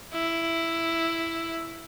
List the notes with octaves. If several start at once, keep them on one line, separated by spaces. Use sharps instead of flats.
E4